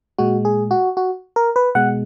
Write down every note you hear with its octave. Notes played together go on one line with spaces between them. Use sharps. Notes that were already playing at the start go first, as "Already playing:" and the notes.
A#2 G#3 F#4
G#4
F#4
F#4
A#4
B4
B2 G#3 F#5